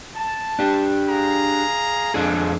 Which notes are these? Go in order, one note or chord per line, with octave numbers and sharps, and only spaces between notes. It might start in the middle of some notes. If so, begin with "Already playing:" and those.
A5
D4 G4
G#4 F5 A#5
F2 G#3 D4 F4 G#4 A4